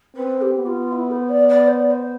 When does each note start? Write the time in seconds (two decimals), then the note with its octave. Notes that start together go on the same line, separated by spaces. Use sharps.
0.16 C4 B4
0.41 G4
0.54 B3
0.66 F4
0.92 E4
1.11 C5
1.29 D5
1.49 D5
1.67 C5
1.79 D5
1.90 C5